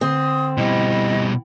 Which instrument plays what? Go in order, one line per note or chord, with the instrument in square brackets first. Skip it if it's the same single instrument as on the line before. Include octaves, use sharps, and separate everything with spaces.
[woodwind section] D3 [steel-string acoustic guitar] C4 [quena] D#6
[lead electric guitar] B2 G3 [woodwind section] E4 [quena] D#5